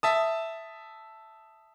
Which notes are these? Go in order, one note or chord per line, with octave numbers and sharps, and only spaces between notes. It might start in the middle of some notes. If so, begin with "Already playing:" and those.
E5 A5 D#6